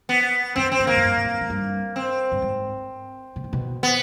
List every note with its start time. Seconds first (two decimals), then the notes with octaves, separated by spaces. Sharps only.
0.09 B3
0.56 F#2 C4
0.72 C4
0.80 G#2
0.87 G2 A#3
0.96 F#2
1.05 G2
1.17 B2
1.25 A#2
1.34 A2
1.41 G#2
1.50 G2
1.96 C4
2.32 G2
2.42 G#2
3.36 B2
3.44 A#2
3.53 B2
3.83 B3